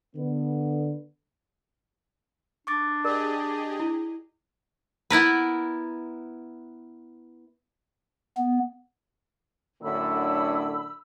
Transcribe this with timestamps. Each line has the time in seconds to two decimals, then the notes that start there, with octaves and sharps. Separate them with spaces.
0.16 D3 B3
2.67 D4 C#6 D6 A6
3.05 G4 G#4 A#4 D5 D#5
3.79 E4
5.10 B3 E4 A#4 B4
8.37 B3
9.83 F#2 A2 D3 B5 E6